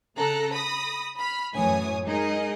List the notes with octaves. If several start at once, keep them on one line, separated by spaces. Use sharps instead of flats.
C#3 A4 A#5 F#6
B5 D#6 A#6
B5 F6
F#2 A2 E3 C#5 G#5 D#6
G#3 D#4 G#4 A#4 D#5